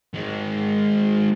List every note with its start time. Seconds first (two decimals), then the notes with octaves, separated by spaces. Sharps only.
0.14 D#3 G#3